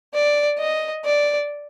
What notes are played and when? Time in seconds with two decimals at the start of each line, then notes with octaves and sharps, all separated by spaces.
0.14 D5
0.58 D#5
1.05 D5